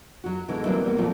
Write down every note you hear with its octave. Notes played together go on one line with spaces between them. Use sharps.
F#3 F#4
B2 D3 E3 G#3 E4
E3 F#3 G3 A#3 C4 E4
G3 A#3 B3
A#2 F3 A3 C4 F4 A#4